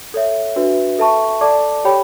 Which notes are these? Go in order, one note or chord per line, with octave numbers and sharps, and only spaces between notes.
A4 C#5 E5
D4 F#4 B4 E5
A4 E5 A5 C#6
A4 D5 A5 D6
G4 C#5 G5 B5